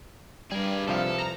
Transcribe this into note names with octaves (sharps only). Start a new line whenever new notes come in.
G2 G3 G#4 A#4
C2 F3 A4 F5
A#5